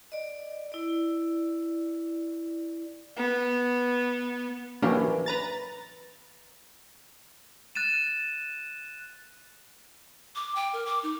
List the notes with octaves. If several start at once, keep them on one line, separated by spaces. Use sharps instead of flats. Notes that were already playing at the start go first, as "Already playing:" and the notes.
D5 D#5
E4 D5
B3
E3 F#3 A#3 C#4 D4 G4
B4 A#5 A6
F#6 A6 D#7 E7
D6
G5
A#4
D6
D#4